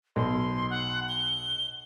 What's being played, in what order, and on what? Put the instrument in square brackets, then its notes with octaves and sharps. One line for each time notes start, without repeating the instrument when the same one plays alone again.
[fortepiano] B1 [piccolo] C6
[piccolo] F#5
G7